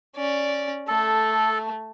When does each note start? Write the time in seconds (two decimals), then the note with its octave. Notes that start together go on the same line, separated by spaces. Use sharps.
0.16 C#4 D5
0.88 A3 A4